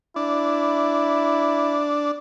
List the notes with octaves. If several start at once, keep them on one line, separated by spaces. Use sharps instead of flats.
D4 E4